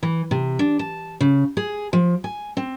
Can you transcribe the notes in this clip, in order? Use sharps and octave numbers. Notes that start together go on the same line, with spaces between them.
E3
C3
D4
A5
C#3
G#4
F3
G#5
C4